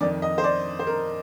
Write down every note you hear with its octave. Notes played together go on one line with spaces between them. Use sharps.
F2 D#3 D5
D#5
C5
D5
C5
A#4